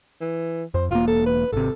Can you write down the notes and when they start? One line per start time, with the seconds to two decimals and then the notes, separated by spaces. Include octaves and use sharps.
0.21 E3
0.74 F2 C5
0.91 E1 A#3 F4
1.07 A4
1.26 B4
1.53 G#1 C3 A4